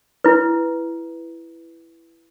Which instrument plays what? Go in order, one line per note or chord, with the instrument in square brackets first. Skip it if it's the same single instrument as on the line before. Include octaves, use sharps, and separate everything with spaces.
[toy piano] E4 B4